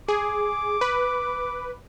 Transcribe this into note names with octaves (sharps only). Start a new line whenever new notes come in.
G#4 D6
B4